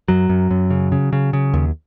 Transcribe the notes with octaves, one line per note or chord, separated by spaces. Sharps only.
F#2 F#3
F#2
F#2
C#3
C#3
C#3
C#3
D#2